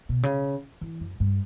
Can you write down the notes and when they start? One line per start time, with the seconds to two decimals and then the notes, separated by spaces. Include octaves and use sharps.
0.09 B2
0.23 C#3
0.81 E3
1.00 F#2
1.20 G2